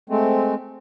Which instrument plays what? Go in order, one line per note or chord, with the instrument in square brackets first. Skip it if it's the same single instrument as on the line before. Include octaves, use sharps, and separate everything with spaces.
[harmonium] G#3 A3 C4